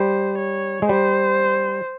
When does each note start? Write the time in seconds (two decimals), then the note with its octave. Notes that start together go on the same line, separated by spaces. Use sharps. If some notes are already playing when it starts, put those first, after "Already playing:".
Already playing: G3 C5
0.38 C#5
0.82 G#3
0.89 G3 C5